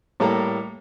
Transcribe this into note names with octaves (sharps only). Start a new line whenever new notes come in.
A2 G3 A#3 A4 A#5